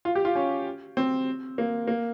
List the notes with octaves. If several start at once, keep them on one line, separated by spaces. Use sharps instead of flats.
F4
G4
F4
C#4
C4
A#3
A#3